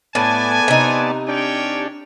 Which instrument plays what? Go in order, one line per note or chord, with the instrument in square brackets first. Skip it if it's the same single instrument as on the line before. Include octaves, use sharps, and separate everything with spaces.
[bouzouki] A2 [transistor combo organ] B3 D5 A5 [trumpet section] G#5
[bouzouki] C3 D#4
[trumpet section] C#4 C#5 G5 [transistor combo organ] D4